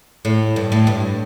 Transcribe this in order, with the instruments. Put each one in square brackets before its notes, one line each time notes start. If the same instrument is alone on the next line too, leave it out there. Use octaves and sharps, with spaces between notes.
[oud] A2
G2
A2
G2